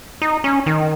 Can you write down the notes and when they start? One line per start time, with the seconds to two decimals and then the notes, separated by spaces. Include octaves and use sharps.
0.22 D#4
0.44 C#4
0.66 D#3